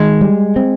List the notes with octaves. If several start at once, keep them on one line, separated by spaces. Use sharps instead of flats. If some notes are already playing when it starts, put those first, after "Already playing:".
Already playing: D#3 G#3
G3
C4